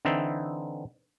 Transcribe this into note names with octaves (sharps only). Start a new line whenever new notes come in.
D3 E3 C4 D#4 E4